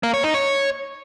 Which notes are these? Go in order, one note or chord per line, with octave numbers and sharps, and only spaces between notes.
A#3
C#5
D#4
C#5